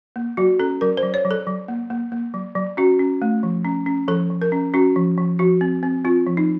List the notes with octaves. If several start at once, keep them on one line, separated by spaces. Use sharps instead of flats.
A#3
F#3 F#4
C#4 A4
F#3 A#4
C5
F#3
C#5
F#3
A4
F#3
A#3
A#3
A#3
F#3
F#3
C#4 F#4
C#4
A3
F3
C#4
C#4
F3 A4
F3
A#4
C#4
C#4 F#4
F3
F3
F3 F#4
C4
C4
C4 F4
F3
D#4